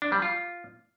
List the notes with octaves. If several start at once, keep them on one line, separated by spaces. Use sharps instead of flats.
D4
G3
F4